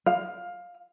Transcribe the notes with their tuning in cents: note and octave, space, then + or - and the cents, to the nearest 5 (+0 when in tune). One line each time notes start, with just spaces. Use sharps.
F5 +15